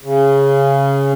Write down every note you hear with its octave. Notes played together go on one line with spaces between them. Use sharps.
C#3